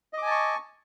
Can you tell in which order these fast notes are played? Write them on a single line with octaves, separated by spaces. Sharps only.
D#5 D6 G#5 A5 C#6